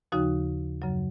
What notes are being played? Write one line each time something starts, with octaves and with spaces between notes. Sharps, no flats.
D#2 C#3 F3 D#4 F#4
F#2 C#3 F#3